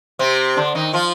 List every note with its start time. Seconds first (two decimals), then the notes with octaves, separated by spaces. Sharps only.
0.19 C3 C4
0.56 D3 D4
0.75 D#3 D#4
0.94 F3 F4